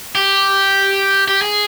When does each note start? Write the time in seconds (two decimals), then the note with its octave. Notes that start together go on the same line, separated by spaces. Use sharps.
0.15 G4
1.28 G4
1.42 G#4